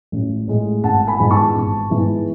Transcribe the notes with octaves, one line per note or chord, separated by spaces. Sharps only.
A1
A2 G#3
G#1 F#5 A5
G#5 B5
G#2 E3 B3
A5 C#6
G#1
G#2 E3 B3